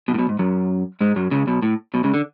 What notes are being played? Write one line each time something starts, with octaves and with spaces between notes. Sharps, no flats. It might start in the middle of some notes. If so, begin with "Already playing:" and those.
B1 B2
A2
B1 B2
G#2
F#2 F#3
G#2 G#3
F#2 F#3
C#2 C#3
B1 B2
A2
B1 B2
C#2 C#3
D3